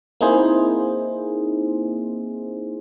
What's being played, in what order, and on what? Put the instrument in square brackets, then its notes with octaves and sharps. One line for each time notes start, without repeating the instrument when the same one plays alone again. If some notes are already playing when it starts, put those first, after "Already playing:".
[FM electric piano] A#3 C4 D#4 E4 G#4 C5